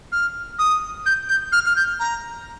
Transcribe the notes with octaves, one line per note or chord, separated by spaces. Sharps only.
F6
D#6
G6
G6
F6
F6
G6
A#5